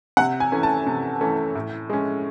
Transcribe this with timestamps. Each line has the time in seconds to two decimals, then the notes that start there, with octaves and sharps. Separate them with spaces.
0.17 C3 F#5
0.40 G#5
0.52 E3 A3 C#4
0.63 A5
0.87 C3
1.21 E3 A3 C#4
1.55 A2
1.90 G#3 C#4